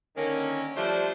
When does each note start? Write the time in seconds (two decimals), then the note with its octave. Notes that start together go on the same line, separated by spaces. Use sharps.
0.17 D3 D#3 A#3 C#4
0.76 F3 G3 A3 D4 C5